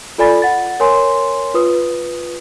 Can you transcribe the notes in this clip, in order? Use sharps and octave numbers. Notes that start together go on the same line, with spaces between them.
F4 A4 D5 G#5 B5 A6
F#5 A6
A#4 C#5 G#5 C6
F4 B4 D#6